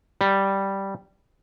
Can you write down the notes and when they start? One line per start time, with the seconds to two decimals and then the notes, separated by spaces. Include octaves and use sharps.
0.21 G3